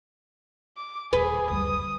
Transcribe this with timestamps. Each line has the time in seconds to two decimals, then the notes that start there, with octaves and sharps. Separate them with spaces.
0.77 D6
1.13 D#1 G#4 B4
1.50 F#1 D2 G3 D#6